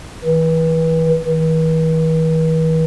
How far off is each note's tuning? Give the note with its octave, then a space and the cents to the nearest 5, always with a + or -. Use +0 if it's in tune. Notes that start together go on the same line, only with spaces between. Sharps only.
E3 -30
E3 -45